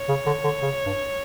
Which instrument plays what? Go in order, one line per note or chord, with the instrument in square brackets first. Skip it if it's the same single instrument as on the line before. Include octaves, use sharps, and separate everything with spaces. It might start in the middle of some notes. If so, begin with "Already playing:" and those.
Already playing: [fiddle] C#5
[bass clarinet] C#3
D3
D3
C#3
G2